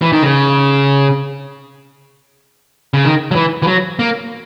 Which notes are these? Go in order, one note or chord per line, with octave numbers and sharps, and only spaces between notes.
E3
D#3
C#3
C#3
D#3
F#3
E3
E3
F#3
A#3